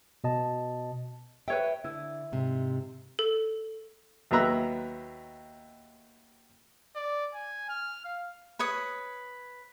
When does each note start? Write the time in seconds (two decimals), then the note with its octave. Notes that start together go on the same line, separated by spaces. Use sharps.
0.24 B2 D#5 A5
1.48 B4 C#5 E5 G5
1.84 D3 E4
2.32 G#2 C3
3.19 A4
4.31 D#2 F#3 B3 E5 A#5 F#6
6.96 D5
7.35 G#5
7.69 F6
8.05 F5
8.59 B4 C#5 D#6